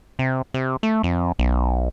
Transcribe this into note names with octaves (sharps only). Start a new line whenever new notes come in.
C3
C3
A3
F2
B1